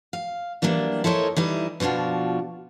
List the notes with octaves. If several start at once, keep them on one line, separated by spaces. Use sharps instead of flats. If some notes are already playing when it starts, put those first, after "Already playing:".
F5
E3 F#3 G3 A#3 D4
E4 A4 A#4 C5 C#5 D#5
E3 G3 D#4 E4
B2 F3 D4 F4 F#4